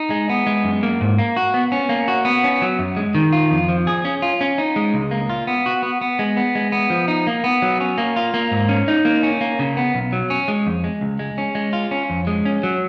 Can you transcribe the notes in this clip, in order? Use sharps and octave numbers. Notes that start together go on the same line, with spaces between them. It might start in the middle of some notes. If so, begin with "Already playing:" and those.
Already playing: D#4
G#3
B3
G#3
F#2
A#3
G#2
A#3
F#4
B3
C#4
A#3
F#4
B3
C#4
F#3
F#2
G#3
D#3
F4
F2
F3
G#4
C#4
F4
C#4
D#4
G#3
C#2
A#3
F4
B3
F#4
B3
B3
G#3
B3
G#3
B3
F3
D#4
A#3
B3
F#3
C#4
A#3
F4
A#3
G#2
C#4
D#4
A#3
C#4
A#3
C#3
B3
B1
F#3
C#4
G#3
F2
G#3
C#2
G#3
C#4
G#3
F4
C#4
F2
G#3
C#4
F#3